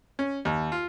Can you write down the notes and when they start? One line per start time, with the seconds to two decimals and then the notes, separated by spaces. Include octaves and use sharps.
0.19 C#4
0.45 D#2
0.72 F4